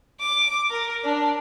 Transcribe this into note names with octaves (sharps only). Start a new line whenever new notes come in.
D6
A#4
D4